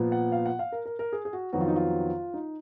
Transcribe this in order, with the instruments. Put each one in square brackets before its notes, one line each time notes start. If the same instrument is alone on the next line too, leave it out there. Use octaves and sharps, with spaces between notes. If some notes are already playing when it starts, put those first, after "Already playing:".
Already playing: [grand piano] A#2 F3 B3
F#5
F5
F#5
F5
A#4
A#4
A#4
G#4
G#4
F#4
F2 D#3 F#3 B3 F#4
F4
D#4
F4
D#4